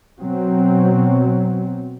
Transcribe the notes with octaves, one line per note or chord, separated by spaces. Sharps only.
B2 F#3 C4